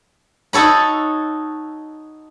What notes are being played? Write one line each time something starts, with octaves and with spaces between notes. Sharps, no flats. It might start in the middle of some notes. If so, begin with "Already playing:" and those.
D#4 F#4 A4 C#5 B5